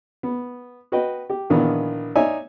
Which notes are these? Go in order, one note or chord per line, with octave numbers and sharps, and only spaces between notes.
B3
F#4 B4 D#5 G5
G4
A#1 D#3 E3 B3
D#4 C#5 D5 E5 G#5